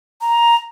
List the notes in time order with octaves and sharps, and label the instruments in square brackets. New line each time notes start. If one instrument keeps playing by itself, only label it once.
[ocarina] A#5